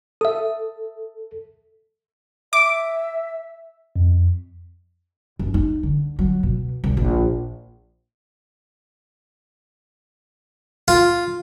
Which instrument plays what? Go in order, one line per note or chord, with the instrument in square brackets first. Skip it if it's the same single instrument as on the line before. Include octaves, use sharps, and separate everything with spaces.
[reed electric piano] A4 [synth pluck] E5 D#6
[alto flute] E5 [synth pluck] D6
[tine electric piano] F2
[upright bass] F#2
D#4
D3
F#3
B2
C2
A#1
[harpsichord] F4